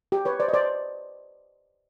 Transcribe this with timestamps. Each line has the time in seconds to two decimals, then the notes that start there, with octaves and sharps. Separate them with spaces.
0.12 G4
0.25 B4 C#5
0.40 C5 D5
0.48 D#5
0.54 C5 D5